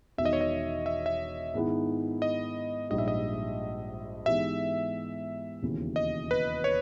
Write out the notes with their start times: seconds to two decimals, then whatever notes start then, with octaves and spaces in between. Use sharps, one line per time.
0.18 E1 E2 D#3 E5
0.25 D#5
0.33 C#5
0.41 D#5
0.86 E5
1.06 E5
1.54 G#2 D#3 G#3 B3 E4
2.22 D#5
2.90 A#1 G#2 G3 D#5
2.98 E5
3.08 D#5
4.26 G#2 E3 G#3 B3 G4 E5
5.62 E1 D#2 C#3 E3
5.96 D#5
6.31 B4
6.64 C#5